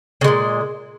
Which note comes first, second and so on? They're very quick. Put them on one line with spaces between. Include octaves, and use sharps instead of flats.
C#3 G#3 A#2